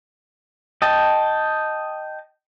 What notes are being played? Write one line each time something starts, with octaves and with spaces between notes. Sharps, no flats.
D#5 G5 A5